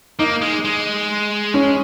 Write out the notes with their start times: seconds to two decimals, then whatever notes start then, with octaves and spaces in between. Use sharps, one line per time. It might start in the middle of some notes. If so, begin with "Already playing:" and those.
0.19 A#3 D#4
0.42 G#3
0.65 G#3
1.54 C#4